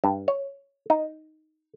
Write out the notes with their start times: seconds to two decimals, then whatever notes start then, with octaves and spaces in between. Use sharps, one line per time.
0.04 G2
0.28 C#5
0.90 D#4